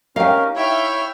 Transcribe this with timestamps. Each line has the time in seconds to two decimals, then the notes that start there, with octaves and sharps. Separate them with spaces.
0.16 C#4 D#4 G4 A#4 F5
0.56 E4 C#5 E5 G5 F6